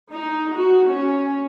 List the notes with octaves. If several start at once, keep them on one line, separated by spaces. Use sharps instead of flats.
D#4
F#4
C#4